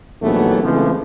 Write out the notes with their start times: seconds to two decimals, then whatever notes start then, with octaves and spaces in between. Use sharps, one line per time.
0.22 A#1 D#2 E3 F#3 A3 B3
0.63 C#3 E3 F3 G#3 A3 C4